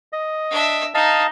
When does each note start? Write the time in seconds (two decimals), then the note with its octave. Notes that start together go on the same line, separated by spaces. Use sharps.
0.13 D#5
0.51 D4 E5
0.94 D#4 D#5 F5 A5